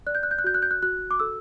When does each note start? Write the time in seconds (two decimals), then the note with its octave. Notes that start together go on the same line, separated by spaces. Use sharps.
0.07 D5 F#6
0.15 G6
0.23 F#6
0.31 G6
0.39 F#6
0.44 F#4 G6
0.54 F#6
0.62 G6
0.71 F#6
0.82 F#4 F#6
1.11 D6
1.19 A4 E6